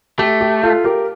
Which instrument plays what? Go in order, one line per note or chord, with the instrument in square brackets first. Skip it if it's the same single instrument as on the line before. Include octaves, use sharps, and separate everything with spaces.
[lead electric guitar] A3 [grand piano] G4
[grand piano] G4
F4 A4
G4 A#4